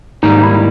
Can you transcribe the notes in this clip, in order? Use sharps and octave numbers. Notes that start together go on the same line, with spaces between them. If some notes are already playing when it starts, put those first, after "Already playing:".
G#2 D#3 G3 A#3 D#4
D#4
E4